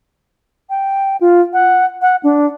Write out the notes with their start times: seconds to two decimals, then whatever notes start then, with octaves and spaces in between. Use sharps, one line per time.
0.70 G5
1.21 F4
1.53 F#5
2.02 F#5
2.23 D4